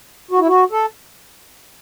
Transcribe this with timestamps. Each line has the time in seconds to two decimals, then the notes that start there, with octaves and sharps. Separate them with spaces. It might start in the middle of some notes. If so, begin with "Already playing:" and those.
0.31 F#4
0.39 E4
0.47 F#4
0.71 A4